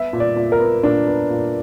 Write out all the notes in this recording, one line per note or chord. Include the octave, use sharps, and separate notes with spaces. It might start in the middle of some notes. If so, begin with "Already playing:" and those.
Already playing: B3 E5
A#2
D5
A#2
A#4
B3
A#2 D4
B3
A#2